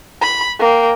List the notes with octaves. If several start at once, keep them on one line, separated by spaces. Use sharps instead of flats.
B5
A#3 G5